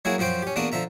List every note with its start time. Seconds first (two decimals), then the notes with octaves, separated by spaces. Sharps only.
0.05 F#3 A#3 E4 F#4 G#4
0.18 F#2 F3 F#4 C5 G5
0.42 C#4 G4
0.56 E2 A#3 D4 F#4 D#6
0.72 D3 F3 E5 A#5